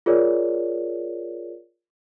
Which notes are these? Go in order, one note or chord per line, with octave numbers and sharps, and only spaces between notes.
F4 G#4 A#4 C#5 D5